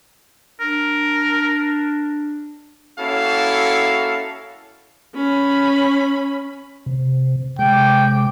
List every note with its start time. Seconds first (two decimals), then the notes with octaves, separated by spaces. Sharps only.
0.60 D4 A#4
2.99 A#3 C#4 E4 F#4 A4 F5
5.15 C#4 B5
6.86 C3
7.59 C3 G#3 G5 D6